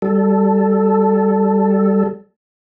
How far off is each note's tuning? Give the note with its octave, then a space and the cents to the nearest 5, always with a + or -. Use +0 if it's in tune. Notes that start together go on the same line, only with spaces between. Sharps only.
G3 +0 A4 +0